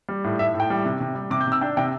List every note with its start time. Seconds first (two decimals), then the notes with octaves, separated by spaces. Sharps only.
0.09 G3
0.24 A2
0.39 A2 E5
0.54 A2
0.60 G5
0.70 G3
0.86 C3
1.00 C3
1.15 G3
1.30 C3 D6
1.41 G6
1.47 C3 E6
1.61 D4 G5
1.77 C3 G5